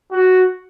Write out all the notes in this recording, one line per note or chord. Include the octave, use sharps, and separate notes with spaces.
F#4